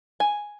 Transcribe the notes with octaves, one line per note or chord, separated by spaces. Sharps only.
G#5